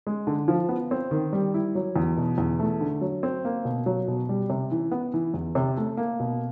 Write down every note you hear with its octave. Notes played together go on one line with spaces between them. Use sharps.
G#3
D3
F3
B3
C4
D#3
G3
E4
F#3
E2
B2
E2
A3
D3
F#3
C4
A#3
B2
F#3
B2
G3
C3
E3
B3
E3
E2
C3
A3
A#3
B2